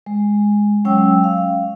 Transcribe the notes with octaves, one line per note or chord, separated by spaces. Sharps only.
G#3
F#3 G#3 C#4 C#5 G5 E6
F5